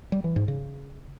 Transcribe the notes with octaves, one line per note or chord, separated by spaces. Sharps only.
G3
E3
G#2
C#3